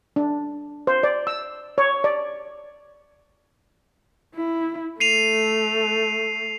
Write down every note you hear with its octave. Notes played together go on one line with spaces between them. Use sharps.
D4
C5
D5
E6
C#5
D5
E4
A3 C7 D#7 F7